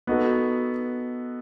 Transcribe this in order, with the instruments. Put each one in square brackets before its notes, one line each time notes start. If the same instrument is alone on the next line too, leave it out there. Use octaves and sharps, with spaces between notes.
[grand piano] B3 D#4 F#4 A4